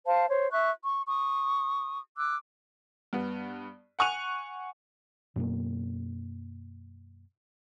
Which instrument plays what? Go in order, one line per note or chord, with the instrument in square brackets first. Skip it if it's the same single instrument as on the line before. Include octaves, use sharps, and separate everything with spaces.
[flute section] C5 F5 A5
C5 C#5
E5 C#6 F#6
C#6
C#6 D#6
D6 E6 F#6
[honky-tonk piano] G2 B3
F#5 G#5 C#6 F#6 D#7 F7
[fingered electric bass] F#2 B2 A#3